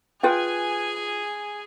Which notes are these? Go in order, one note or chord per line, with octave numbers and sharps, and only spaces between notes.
F4 G#4 B4 G5 G#5